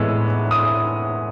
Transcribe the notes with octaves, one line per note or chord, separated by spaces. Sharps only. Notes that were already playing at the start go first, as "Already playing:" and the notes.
Already playing: A2 E3 G#3 B3 E6
D#6